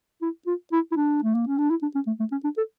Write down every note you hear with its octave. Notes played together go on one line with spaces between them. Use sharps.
E4
F4
E4
E4
D4
A3
A#3
C#4
D4
E4
D4
C#4
A3
A3
C#4
D4
A4